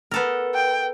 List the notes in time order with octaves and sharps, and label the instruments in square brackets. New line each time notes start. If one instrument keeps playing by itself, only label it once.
[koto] B3 A4 A#4
[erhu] G5